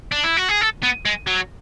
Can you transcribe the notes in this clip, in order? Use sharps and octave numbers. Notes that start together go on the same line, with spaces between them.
D4
E4
F#4
G#4
A4
B3
G#3
F#3